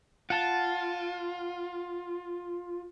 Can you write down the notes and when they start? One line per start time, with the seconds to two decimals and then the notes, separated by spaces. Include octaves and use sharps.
0.30 F4 F#5 A5